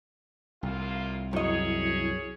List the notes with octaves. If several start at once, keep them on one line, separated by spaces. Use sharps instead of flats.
C2 A2 A#3 F4
F#2 C#4 E4 G#4 C#5 D#5